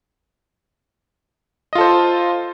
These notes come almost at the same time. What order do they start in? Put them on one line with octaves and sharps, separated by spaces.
D#5 F4 A4 C5